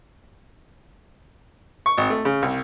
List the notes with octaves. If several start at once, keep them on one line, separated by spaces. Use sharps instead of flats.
C#6
G#1
A3
C#3
C2